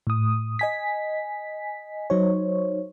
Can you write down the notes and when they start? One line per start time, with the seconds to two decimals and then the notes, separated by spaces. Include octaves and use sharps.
0.07 A2 D#6
0.59 D#5 G#5 B6
2.10 F#3 D#4 C5 C#5